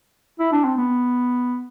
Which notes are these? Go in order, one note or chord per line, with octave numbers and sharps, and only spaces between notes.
E4
D4
C4
B3